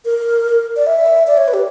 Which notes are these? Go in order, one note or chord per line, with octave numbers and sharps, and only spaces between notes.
A#4
D5
E5
D5
C#5
B4
G4